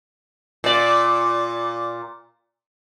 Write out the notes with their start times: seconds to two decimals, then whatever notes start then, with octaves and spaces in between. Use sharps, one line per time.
0.64 A#2 D5